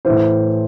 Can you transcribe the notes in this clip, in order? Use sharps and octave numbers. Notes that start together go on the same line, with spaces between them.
A2 E3 C5